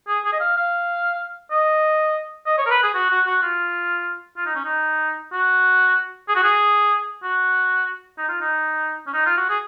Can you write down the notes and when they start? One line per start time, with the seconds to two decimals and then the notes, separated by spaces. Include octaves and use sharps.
0.08 G#4
0.25 G#4
0.32 D#5
0.40 F5
0.56 F5
1.51 D#5
2.46 D#5
2.58 C#5
2.66 A#4
2.70 B4
2.83 G#4
2.94 F#4
3.10 F#4
3.26 F#4
3.42 F4
4.37 F4
4.46 D#4
4.55 C#4
4.64 D#4
5.33 F#4
6.28 G#4
6.35 F#4
6.43 G#4
7.23 F#4
8.18 D#4
8.28 F4
8.41 D#4
9.07 C#4
9.13 D#4
9.26 F4
9.37 F#4
9.49 G#4